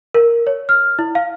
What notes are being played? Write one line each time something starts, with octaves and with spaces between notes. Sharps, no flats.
A#4
C#5
F6
E4
F5